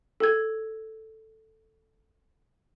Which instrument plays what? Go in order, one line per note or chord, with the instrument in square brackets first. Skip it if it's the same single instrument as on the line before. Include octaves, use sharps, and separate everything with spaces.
[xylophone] A4 G#6